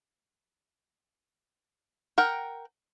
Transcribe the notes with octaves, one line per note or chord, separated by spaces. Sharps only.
A#4 F#5 G5